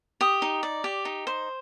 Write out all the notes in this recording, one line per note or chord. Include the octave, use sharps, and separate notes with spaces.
G4 D#6
D#4
D5
G4
D#4
C5